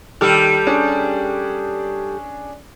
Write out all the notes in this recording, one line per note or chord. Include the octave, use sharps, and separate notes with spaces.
D#3 G3 G4 A4 F6
C#4 D4 G#4